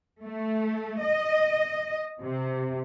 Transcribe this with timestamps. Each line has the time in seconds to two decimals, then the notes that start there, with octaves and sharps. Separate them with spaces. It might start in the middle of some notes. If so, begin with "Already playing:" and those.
0.23 A3
1.03 D#5
2.21 C3